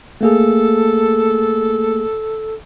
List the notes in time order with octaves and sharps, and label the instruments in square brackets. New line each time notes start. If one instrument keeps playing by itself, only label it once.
[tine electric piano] A3 A#3 G#4 [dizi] A4